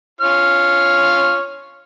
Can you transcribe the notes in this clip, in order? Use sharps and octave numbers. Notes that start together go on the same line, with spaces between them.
F4 C#5 F6